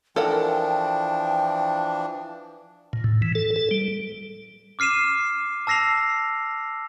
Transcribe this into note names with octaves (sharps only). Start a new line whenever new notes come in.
E3 F3 D4 A4 A#4 F#5 G5
A#2
A2
E3
A4
A4
G3
D6 F6 C7 D#7 E7
A5 E6 A#6 C7 F7